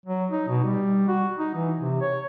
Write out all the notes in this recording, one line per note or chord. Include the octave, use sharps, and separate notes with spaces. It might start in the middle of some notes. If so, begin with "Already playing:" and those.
F#3
D#4
B2
G3
F#4
D#4
E3
C3
C#5